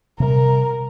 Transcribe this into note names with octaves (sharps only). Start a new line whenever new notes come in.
C3 G3 A#4